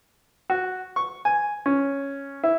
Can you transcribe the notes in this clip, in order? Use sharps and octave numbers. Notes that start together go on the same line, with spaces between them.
F#4
C#6
G#5
C#4
E4